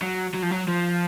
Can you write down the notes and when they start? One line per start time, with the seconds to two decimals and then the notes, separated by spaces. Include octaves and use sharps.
0.02 F#3
0.35 F#3
0.43 F3
0.51 F#3
0.68 F3